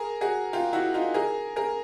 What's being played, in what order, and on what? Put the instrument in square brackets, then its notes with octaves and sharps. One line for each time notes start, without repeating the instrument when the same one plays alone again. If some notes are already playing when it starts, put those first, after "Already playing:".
Already playing: [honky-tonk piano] G#4 A#4
F#4 G#4
F4 G4
E4 F#4
D#4 F4
G#4 A#4
G#4 A#4